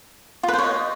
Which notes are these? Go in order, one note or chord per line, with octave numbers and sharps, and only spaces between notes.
F4
B4
C5
C#5
D#5